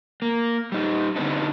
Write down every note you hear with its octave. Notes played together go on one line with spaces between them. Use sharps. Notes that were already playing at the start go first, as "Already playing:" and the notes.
A#3
G3 D#4
D3 G3 B3 C4 D4 D#4